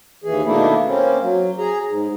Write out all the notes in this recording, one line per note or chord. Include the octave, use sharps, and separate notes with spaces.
D#2 E3 G#4
B2 D#3 A3 A#3 D4 E4
A#3 C4 C#4
F#3
G#4 A#5
G#2